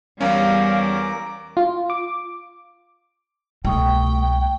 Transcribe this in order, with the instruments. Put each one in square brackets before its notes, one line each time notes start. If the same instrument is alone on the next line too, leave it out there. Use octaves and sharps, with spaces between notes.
[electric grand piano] E2 C#4 [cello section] G3 [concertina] A#4 D6 [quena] F5
[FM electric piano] F4
D6
[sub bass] C2 [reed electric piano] B2 C#6 D#6 [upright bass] A3 [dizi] G5